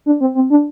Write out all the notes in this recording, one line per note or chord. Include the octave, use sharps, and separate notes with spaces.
D4
C4
C4
D4